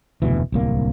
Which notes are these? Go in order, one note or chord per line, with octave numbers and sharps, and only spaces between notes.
F1 D2 B2 E3
D1 C2 A#3